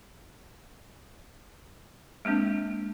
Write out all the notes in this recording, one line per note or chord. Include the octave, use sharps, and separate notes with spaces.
G#3 A#3 C4 D4